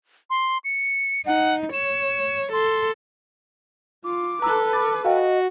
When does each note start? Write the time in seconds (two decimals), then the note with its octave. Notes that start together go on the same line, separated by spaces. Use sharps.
0.30 C6
0.64 C#7
1.26 D#4 F#5
1.73 C#5 E7
2.53 A4 C6
4.04 F4 D6
4.42 A4 B4 A#5 E6 F#6
4.73 B5 D6 A6
5.05 F#4 D#5 F5 G5